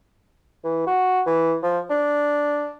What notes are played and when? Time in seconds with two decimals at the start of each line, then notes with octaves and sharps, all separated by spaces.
0.64 E3
0.87 F#4
1.26 E3
1.63 F3
1.90 D4